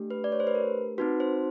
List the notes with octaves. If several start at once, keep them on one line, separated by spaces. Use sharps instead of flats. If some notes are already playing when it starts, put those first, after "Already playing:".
Already playing: A3 D4 G4
B4
D5
C#5
C5
B4
A#4
C4 D#4 F#4 B4
C5